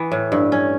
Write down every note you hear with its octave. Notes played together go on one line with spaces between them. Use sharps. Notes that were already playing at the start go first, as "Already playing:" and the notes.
Already playing: E3 B3
A2
G2
C#4